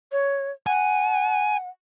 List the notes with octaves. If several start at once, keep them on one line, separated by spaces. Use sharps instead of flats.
C#5
F#5 G#5